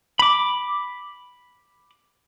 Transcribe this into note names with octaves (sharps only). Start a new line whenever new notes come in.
B5 D6